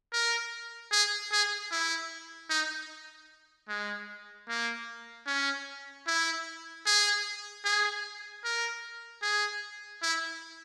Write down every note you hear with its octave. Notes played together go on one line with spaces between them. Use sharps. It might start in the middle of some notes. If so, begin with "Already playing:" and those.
A#4
G#4
G#4
E4
D#4
G#3
A#3
C#4
E4
G#4
G#4
A#4
G#4
E4